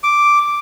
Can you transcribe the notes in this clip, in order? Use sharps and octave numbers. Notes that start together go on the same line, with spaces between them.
D6